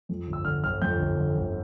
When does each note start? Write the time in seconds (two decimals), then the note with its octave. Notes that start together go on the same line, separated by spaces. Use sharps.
0.09 F2
0.27 G1
0.33 E6
0.45 D3 F6
0.63 G1 F6
0.82 F2 G6
0.99 G1
1.17 D3
1.36 G1